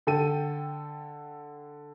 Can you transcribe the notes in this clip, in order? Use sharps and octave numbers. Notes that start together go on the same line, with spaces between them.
D3 A4 G5 D#7